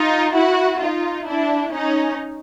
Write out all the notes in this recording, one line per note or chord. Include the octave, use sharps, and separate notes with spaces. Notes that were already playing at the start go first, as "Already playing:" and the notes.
Already playing: D#4 F4
E4 F#4
D#4 F4
D4 E4
C#4 D#4